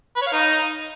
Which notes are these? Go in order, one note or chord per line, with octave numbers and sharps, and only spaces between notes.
B4
C#5
F5
D#4